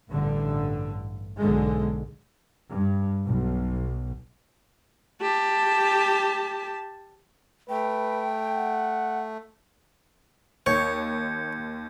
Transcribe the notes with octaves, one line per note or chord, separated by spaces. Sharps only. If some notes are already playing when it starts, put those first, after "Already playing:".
A1 G2 D3
B1 G#2 D3 G#3
G2
B1
G4 A5
A3 B4 G5
F#5
D#2 C#5 G6 G#6 C#7